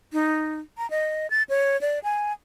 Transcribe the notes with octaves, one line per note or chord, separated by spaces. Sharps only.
D#4
A#5
D#5
A6
C#5
D5
G#5